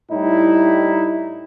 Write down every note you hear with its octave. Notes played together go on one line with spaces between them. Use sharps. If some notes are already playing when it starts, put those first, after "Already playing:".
A2 G3 D#4 E4